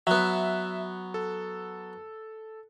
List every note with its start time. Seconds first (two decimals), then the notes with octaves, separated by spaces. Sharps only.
0.07 F#3 B3 E5 F#6
1.14 A4